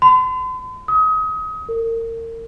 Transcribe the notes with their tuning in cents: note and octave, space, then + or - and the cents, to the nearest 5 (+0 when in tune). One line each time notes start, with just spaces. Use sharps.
C6 -45
D#6 +30
A#4 -35